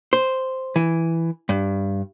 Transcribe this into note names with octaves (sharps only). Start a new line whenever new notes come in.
C5
E3
G2